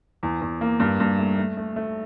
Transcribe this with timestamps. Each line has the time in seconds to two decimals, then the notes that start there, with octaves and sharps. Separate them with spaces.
0.23 E2
0.41 E2
0.61 A#3
0.80 G2
1.00 G2
1.19 A3
1.38 A3
1.57 A3
1.76 A3